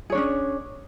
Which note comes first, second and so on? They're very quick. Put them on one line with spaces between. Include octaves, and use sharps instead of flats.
G#4 C#5 D4 C#4